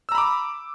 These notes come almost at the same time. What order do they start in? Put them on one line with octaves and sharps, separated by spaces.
E6 A#5 B5 D6